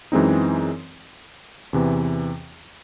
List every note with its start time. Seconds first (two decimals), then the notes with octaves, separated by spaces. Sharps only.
0.12 F#2 E3 G#3 C4 D#4
1.73 E2 C3 E3